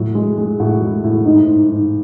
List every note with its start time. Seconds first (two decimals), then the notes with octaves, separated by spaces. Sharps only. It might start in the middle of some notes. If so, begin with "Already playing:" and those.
Already playing: A2 F#3
0.15 G#3
0.38 G#3
0.60 A2 F#4
0.82 G#3 E4
1.04 A2 E4
1.25 G#2 D#4
1.47 G#2
1.69 G#2